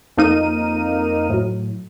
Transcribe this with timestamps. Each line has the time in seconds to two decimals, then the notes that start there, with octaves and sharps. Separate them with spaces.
0.17 F2 A#3 D#4 F6 D#7
1.30 A2 F#3